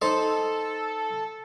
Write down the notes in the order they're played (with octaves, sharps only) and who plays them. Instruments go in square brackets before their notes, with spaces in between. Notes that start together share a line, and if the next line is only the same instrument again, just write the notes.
[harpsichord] D#4 C5 D#5 [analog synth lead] A4